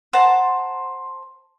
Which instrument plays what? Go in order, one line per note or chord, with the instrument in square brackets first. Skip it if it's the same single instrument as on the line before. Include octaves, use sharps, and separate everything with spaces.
[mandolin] C5 A5 A#5 [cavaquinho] F#5